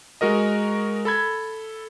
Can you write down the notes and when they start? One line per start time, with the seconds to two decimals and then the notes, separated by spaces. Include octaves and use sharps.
0.21 G#3 F#4 A#4 D#5
1.05 A4 B5 G#6